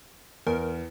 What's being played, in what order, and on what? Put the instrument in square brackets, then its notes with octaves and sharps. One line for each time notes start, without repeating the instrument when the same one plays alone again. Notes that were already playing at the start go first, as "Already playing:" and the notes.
[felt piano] E2 [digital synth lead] A#4